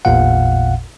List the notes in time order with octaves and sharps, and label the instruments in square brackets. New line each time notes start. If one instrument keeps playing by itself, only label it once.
[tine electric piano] A1 E2 A#2 F5 F#5